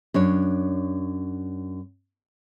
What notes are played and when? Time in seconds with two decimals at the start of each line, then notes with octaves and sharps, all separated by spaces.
0.14 F#2 D4 C#5